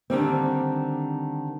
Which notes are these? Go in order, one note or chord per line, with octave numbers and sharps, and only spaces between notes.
D3 D#3 G3 C4